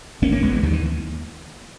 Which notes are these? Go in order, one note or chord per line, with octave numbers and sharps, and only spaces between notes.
G#1 A#3 C#4
A#3 C#4
G#1 G#3 B3
E3 G#3
D#2 D#3 G3
E3